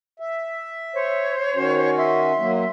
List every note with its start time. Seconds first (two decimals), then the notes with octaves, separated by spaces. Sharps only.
0.20 E5
0.94 C5 C#5
1.56 D#3 C#4 F#4
1.98 E5 C6
2.38 F#3 A#3